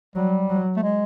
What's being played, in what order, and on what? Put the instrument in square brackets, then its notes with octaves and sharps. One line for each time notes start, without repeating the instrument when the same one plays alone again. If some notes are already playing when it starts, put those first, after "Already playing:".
[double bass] F#3 [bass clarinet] G3
[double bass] F#3
[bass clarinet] A3
G#3